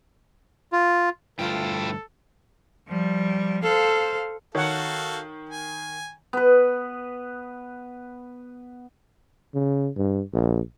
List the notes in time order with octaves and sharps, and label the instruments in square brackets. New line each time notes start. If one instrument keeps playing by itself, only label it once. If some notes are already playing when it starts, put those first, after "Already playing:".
[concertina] F4
[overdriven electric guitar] D2 G2 [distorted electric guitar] E4 G5 [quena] F4 [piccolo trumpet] A4
[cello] F3 G3
[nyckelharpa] A4 [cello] C5 F5
[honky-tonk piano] D#3 [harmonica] F#4 A4 F5 [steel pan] C#5 F#5
[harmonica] G#5
[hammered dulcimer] B3 B4
[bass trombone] C#3
G2
A#1